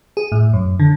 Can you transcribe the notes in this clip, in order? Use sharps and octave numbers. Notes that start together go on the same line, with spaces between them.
G#4
A2
F#2
D3